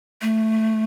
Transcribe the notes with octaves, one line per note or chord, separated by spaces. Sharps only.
A3